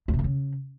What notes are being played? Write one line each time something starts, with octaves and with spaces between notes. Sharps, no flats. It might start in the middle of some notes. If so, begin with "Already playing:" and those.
E2
C3
F2
C#3